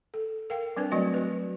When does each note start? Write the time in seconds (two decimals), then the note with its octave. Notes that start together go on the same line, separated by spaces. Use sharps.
0.14 A4
0.50 A#4 F5 G5
0.77 G3 C4 D4 B4
0.91 F#3 A3 C4 F#4 D5 D#5
1.14 F#4 B4